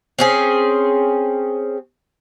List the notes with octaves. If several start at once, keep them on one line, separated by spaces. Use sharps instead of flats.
C4 C#4 G#4